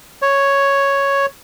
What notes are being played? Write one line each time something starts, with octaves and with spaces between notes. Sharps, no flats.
C#5